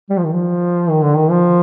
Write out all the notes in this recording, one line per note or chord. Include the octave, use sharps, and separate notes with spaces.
G3
F3
D#3
F3
D#3
D3
D#3
F3